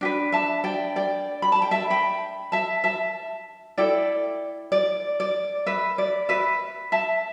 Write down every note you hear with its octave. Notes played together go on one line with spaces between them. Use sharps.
D4 G4 B4
E5 A5
D5 G5
D5 G5
B5
A5
G5
E5 A5
G5 B5
E5 A5
E5 A5
E4 A4 D5 G5
D5
D5
B4 E5
D5
B4 E5
E5 A5